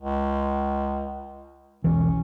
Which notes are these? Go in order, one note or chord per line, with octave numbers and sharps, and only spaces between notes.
C#2
E1 B1 E3 C#4